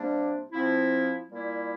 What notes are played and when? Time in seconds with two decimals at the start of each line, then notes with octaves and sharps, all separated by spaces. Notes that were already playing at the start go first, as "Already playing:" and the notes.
Already playing: C3 G3 A#3 D4
0.51 F3 C4 E4
1.28 A#2 G3 A#3 E4